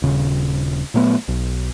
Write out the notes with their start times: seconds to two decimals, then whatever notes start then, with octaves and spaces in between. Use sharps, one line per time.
0.02 D#1 C#3
0.94 A#2 F#3 A3 B3
1.28 B1